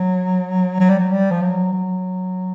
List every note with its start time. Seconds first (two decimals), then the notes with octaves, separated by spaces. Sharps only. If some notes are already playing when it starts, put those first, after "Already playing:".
Already playing: F#3
0.80 F#3
0.89 G3
0.99 F#3
1.11 G3
1.31 F3
1.42 F#3
1.73 F#3